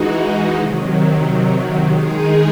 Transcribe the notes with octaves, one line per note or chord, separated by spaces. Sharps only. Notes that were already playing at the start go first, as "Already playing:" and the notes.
Already playing: E3 G#3 D#4 F#4
C3 D#3 F#3
D#3 G#3 D#4 G#4